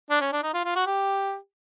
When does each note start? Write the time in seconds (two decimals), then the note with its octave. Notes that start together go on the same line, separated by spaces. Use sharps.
0.10 D4
0.21 C#4
0.33 D4
0.43 D#4
0.54 F4
0.65 F4
0.76 F#4
0.87 G4